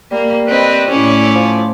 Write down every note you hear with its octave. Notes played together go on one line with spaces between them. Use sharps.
G3 A#3
C4 B4 D#5
A2 C#4 E4 D5
F3